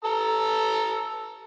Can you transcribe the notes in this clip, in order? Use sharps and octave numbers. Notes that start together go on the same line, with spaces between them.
A4 A#5 E6